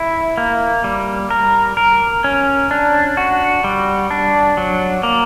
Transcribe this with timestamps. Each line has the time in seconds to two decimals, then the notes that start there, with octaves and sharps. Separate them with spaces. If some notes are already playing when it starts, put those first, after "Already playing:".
Already playing: E4
0.38 A#3
0.84 G3
1.31 A#4
1.77 A#4
2.24 C#4
2.71 D4
3.17 F#4
3.64 G3
4.11 D4
4.57 F#3
5.03 A#3